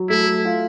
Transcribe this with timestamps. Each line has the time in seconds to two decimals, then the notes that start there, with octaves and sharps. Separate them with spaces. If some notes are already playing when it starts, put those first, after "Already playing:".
Already playing: F#3
0.09 A3 E4
0.45 F4